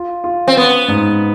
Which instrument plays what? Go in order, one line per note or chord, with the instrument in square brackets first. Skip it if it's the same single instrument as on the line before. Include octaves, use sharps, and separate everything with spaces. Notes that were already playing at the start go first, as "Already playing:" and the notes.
Already playing: [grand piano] F4
F4
[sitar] C4
[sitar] B3 [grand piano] C#4
[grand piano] G#2